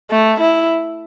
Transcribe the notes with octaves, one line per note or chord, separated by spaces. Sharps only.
A3
E4